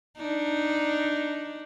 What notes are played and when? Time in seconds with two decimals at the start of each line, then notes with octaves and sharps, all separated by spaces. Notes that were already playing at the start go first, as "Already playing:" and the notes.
0.18 D4 D#4